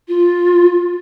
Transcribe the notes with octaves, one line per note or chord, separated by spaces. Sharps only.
F4